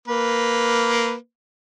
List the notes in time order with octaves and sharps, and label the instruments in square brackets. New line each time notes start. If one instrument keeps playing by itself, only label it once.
[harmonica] A#3 B4